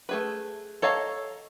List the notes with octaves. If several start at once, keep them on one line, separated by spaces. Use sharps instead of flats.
A3 G#4 B4
A4 C#5 D#5 F5 A#5